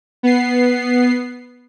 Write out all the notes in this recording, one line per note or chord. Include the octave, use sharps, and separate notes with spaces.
B3 C7